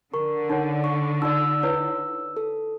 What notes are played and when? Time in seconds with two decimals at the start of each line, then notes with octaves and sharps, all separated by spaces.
0.14 D3 A#4 C#6
0.50 D#4 C#5 F#5
0.84 C#6
1.22 D#4 F4 D5 E6
1.63 E4 B4 C#5
2.37 A4